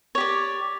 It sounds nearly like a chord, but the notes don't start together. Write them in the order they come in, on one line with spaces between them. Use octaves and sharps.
C#5 G4 D5